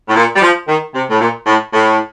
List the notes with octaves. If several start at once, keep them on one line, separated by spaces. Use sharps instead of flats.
A2
A#2
G3
F3
D#3
C3
A2
A#2
A2
A2